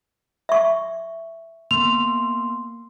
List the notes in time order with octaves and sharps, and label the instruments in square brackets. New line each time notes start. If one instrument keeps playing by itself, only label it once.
[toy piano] E5 C#6
[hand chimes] A#3 B3 C6 [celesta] F7